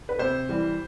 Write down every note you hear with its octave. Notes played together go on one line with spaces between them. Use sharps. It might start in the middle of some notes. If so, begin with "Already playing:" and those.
B4
C3 C5
E3 G3